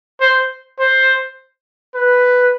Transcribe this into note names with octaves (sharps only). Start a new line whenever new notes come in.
C5
C5
B4